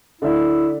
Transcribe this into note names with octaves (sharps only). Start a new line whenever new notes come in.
D3 A3 D4 E4 A4 E5